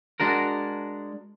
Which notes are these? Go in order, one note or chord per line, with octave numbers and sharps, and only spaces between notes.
G#3 D4 F#4 A#4